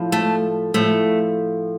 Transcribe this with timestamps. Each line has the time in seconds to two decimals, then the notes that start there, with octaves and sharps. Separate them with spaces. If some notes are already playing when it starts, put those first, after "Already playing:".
Already playing: A2 F3
0.12 A3
0.74 A2 F3 A3